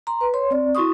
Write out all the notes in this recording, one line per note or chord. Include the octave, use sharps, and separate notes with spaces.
A#5 C6
B4
C#5 C6
C4 D5
E4 F#4 C6 C#6 D#6